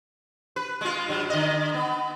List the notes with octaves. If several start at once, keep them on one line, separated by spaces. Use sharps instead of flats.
B4
G#3 F4
G2 F#3
D3 D#5
B3